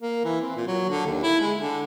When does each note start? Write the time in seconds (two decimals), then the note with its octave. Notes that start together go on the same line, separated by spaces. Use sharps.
0.02 A#3
0.25 E3
0.41 C4
0.56 A#2
0.68 F#3
0.89 D3
1.06 D#2
1.23 E4
1.41 G#3
1.58 D3